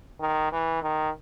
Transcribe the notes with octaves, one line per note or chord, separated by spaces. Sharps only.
D#3
E3
D#3